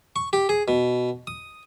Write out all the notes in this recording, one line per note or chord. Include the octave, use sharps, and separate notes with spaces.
C#6
G4
G#4
B2
D#6